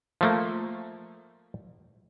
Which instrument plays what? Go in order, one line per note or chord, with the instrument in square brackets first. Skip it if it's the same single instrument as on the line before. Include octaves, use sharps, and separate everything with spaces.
[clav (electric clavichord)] F3 A3 A#3